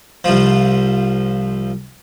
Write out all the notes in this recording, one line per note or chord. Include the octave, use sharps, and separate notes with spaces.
C2 F3